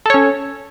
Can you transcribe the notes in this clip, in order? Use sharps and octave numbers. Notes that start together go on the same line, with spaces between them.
C#4 A4 C#5